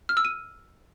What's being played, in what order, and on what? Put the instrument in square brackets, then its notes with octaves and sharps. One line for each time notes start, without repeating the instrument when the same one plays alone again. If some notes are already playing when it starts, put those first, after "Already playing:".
[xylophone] F6
E6
D#7